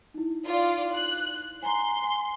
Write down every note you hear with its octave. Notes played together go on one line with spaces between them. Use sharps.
D#4 E4
F4 D5
F#6
G#5 A#5 C6
G#5